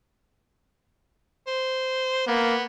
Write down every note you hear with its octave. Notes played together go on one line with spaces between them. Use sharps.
C5
A#3 B3